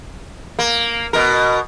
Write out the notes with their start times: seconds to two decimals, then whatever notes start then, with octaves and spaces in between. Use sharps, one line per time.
0.59 A#3
1.13 B2 A#4